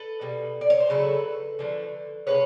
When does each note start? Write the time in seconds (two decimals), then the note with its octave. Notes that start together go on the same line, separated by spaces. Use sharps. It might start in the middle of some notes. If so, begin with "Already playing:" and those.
Already playing: A4 B4
0.21 B2 G3
0.61 D5
0.70 C#5
0.80 C5
0.89 C#3 F#3 A3 A4 B4
1.59 D3 F3 A3
2.27 C3 F3 G#3 B4 C#5